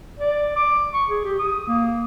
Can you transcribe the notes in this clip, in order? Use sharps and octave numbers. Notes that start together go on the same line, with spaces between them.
D5
D6
C#6
G#4
G4
D#6
A#3